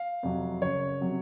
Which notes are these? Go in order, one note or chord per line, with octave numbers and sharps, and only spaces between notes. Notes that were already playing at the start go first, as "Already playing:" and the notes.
Already playing: F5
F2 C3 F#3
F#1 C#5
C3 F#3